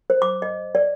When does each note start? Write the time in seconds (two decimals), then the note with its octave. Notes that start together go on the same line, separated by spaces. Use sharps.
0.10 C5
0.22 D6
0.42 D#5
0.75 D5